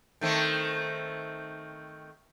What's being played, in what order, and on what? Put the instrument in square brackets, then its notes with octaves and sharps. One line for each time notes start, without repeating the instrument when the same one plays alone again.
[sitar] D#3 A3 C4